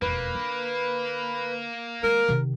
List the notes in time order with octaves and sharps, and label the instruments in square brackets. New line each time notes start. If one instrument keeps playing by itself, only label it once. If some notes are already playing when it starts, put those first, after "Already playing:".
[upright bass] E1 F2 [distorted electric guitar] A#3 [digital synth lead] B4
[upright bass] D3
[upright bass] D#3 G#3 [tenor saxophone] A#4
[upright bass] C3 D#3